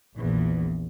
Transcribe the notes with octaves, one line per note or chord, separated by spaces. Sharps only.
A#1 E2